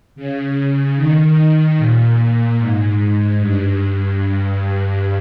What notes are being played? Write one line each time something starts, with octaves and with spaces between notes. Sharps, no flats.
C#3
D#3
A#2
A#2
G#2
G2
G2
G2